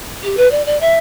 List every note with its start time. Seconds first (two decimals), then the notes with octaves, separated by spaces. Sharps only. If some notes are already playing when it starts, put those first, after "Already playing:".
0.23 G4
0.37 B4
0.51 D5
0.66 D5
0.80 E5